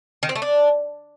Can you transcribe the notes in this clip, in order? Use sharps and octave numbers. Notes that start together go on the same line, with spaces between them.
D#3
C4
A3
D4